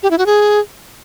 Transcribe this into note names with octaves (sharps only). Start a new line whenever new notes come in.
G4
E4
F#4
G#4